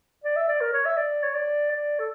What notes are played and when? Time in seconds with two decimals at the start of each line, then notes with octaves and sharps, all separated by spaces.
0.24 D5
0.36 E5
0.48 D5
0.61 A#4
0.73 C#5
0.85 E5
0.97 D5
1.23 C#5
1.35 D5
1.71 D5
1.99 A4